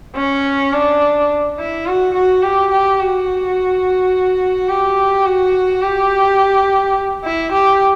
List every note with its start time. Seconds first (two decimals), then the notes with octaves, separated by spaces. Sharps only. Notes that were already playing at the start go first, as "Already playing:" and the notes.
0.16 C#4
0.73 D4
1.59 E4
1.87 F#4
2.14 F#4
2.43 G4
2.72 G4
3.00 F#4
4.69 G4
5.26 F#4
5.82 G4
7.24 E4
7.52 G4